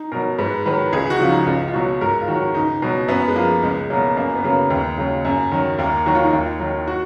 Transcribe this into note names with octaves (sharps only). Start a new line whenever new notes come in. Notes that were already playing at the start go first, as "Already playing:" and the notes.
Already playing: D#4
B2 F#3 A#4
G#2 B4
D#3 F#3 B4
C#2 G#4
F#4
C#3 F3 F4
D#4
C#2 F4
F4
B2 F#3 F#4
G#2 A#4
F4
D#3 F#3 F#4
C#2 D#4
B2 F#3
F#2 B3
G#3
F3 A#3
C#2 G#3
B2 F#3 A#3
F#2 A#3
B3
C#3 F#3 A#3
D#2
C#3 F#3
F#2
D#3 F#3
D#2 A#3
D#3 F#3 F#4
F4
D#4
D#2 F4
D#3 F#3
F#4